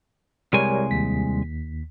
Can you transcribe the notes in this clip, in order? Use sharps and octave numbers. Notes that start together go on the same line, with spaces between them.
C2 G3 G#3 A#4 C#5 G#5
D#2 B6